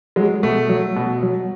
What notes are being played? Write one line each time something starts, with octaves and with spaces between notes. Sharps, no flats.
F#3 G#3
B2 A3
F#3
B2
F#3